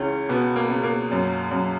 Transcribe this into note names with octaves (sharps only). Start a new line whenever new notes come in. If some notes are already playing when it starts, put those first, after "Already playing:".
Already playing: C#2 E3 C#4
B2 B3
A#3
C#2
A#3
F#2
F#2